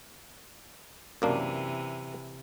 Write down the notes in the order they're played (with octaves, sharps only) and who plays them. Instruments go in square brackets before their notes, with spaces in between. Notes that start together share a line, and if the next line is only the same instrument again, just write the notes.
[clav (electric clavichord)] F#2 A#3 D4 [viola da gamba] C3 E3